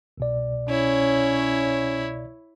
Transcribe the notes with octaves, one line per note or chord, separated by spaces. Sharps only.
C2 B2 D5
C#4 E4 C#5